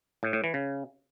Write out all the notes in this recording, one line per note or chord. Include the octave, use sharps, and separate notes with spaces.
A2
A2
E3
C#3